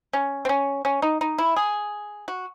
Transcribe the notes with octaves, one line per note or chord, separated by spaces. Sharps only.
C#4
C4
C#4
C#4
D#4
D#4
E4
G#4
F#4